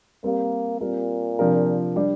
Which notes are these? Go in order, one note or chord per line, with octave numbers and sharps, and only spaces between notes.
G3 A#3 C4 A#4
A#2 G3 C4 A#4
C3 F3 D4 A#4
G3 D4 G4